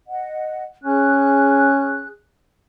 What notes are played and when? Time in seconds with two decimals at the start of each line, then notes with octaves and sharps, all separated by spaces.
0.08 D#5 F#5
0.84 C#4 G#4 F#6